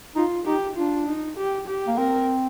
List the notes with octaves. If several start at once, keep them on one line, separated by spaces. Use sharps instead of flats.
D#4 F4
D#4 G4
D4 F4
D#4
G4
G4
A#3
C4 A#4